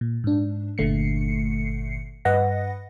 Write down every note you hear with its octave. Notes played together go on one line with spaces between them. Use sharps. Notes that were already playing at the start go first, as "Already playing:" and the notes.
A#2
G#2 D4
G1 A#2 D3 A3 C7 C#7
G2 B4 D#5 F#5 A#6